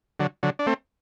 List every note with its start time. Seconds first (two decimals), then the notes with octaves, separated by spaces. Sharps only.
0.20 D3 F#3
0.43 D3 F#3
0.59 D4
0.67 A3 C4